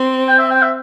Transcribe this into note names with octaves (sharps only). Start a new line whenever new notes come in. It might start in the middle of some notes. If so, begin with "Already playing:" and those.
Already playing: C4
G5
E5
G5
E5